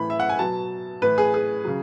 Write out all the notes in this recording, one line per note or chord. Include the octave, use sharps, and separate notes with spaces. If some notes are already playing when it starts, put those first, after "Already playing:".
Already playing: A2 E3 B5
E5
F#5
G#5
B2 F#3 A5
A2 E3 B4
G#4
G#4
C#3 F#3